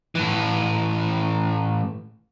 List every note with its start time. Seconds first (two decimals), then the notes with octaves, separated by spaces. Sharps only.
0.15 A2 E3